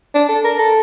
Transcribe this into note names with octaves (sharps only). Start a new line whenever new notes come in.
D4
A4
A#4
A4